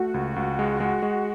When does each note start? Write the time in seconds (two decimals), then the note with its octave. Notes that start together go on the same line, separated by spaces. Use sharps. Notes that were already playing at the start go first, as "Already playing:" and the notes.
Already playing: A3 F#4
0.14 C#2
0.36 C#2
0.59 G#3
0.80 G#3
1.02 G#3